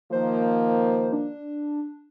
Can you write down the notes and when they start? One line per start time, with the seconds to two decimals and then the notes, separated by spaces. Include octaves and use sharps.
0.12 D#3 F3 A#3 C5
1.13 D4